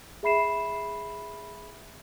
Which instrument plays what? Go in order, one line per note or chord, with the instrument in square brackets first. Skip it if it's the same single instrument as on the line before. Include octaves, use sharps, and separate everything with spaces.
[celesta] G#4 E5 B5 C7 E7